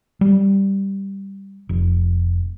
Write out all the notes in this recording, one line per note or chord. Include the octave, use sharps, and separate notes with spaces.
G3
F1